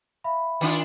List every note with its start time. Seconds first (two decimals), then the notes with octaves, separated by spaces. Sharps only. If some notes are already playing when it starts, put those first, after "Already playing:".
0.24 E5 F5 B5
0.61 D#3 D4 F4